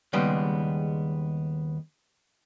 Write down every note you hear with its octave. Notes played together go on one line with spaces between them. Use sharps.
D#2 C#3 G3 G#3 B3